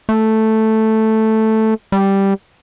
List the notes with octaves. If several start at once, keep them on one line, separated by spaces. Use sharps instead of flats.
A3
G3